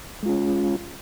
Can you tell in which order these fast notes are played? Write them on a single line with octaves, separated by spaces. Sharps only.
G#3 F4 C#4